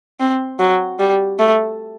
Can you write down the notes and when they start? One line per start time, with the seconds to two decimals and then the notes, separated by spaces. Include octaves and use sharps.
0.20 C4
0.60 F#3
1.00 G3
1.39 A3